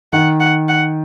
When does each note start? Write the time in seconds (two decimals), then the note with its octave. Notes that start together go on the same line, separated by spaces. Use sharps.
0.13 D#3 F#5
0.40 F#5
0.68 F#5